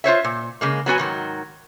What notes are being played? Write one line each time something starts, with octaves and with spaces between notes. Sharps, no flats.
F4 C5 C#5 E5
A#2
C#3 G#3 A#3
F#3 B3 F#4 G#5
G#2 D#3 F#3